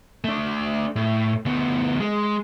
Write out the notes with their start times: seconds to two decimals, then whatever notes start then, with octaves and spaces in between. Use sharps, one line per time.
0.24 A3 D4
0.96 A2
1.46 D2 B3
2.00 G#3